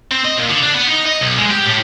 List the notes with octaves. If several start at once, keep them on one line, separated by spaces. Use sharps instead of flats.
C4
D#5
A#2
D3
D4
B3
D#4
D#5
B1
G#3
G4
A2